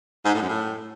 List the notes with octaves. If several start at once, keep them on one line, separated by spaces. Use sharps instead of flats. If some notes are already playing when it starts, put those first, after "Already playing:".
G#2
A2
F#2
A2